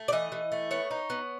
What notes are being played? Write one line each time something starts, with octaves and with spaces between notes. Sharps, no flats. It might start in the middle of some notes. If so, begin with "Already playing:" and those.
Already playing: A3
D5
E3 D#5
E3
A3
B3 C#5
D#4
B3